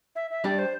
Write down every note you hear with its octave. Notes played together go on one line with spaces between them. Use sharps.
E5
E5
G3 D4 G4 D5
C5